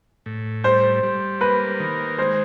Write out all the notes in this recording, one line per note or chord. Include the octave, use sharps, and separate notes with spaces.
A2
G3 C5
G3
A#3 B4
D#3
G#3 C5